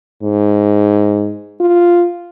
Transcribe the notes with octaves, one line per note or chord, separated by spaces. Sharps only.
G#2
F4